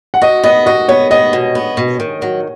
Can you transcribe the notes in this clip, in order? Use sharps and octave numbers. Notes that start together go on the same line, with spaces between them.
F#5
F#4 D#5
B3 D#5
F#4 D#5
B3 C#5
B3 D#5
B2
B3
B2
D#3
F#3